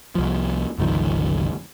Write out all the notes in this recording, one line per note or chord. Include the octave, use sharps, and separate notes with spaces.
C2 F3
G1 C#2 D#3 F3